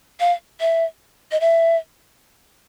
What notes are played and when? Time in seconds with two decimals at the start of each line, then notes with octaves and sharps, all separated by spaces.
0.20 F5
0.60 E5
1.31 D#5
1.40 E5